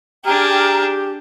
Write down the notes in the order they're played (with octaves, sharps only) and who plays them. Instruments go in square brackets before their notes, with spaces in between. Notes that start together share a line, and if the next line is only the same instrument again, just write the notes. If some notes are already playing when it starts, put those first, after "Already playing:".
[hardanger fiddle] D4 G#4 [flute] G4 [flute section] G5 A#5 F6